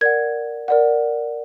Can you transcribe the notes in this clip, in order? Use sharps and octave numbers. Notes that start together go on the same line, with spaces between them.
A#4 D5 F#5 G#6
A#4 D5 F#5